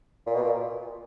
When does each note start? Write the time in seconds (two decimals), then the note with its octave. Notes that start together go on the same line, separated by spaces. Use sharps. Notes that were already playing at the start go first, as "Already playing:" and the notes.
0.27 A#2
0.35 B2
0.42 A#2